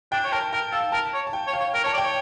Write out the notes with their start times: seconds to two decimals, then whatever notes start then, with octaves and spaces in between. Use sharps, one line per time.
0.12 D4 G5
0.24 C#5
0.32 A#4 A5
0.53 A#4 G5
0.72 A4 F5
0.92 A#4 A5
1.14 C#5
1.27 A5
1.33 G5
1.47 C#5
1.53 F5
1.60 C#5
1.74 A#4 G5
1.84 C#5 A5
1.93 D5
1.98 G5
2.04 C#5